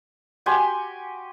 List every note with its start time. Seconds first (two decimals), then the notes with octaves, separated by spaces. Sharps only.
0.46 F#4 G4 G#5 C6